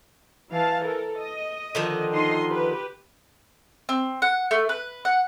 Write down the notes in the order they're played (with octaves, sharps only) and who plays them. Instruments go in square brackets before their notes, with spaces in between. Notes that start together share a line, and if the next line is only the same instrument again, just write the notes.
[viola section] E3 F5 A5
A4 A#4
D#5
[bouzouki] D3 D#3 F3
[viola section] D#4 D#5 C6
G4 B4
[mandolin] C4
F#5
A3
B4
F#5